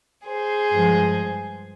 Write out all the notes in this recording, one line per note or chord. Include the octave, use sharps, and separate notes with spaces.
G#4 C5
G2 F3 G#3